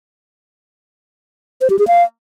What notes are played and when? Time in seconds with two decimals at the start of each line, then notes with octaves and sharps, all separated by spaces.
1.61 C5
1.70 G4
1.79 G#4
1.88 F5